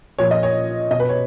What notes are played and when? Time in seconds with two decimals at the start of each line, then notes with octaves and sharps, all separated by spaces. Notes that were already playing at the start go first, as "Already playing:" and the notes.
0.19 A#2 F3 C#5
0.31 D#5
0.43 C#5
0.91 B2 D#5
1.00 B4
1.09 C#5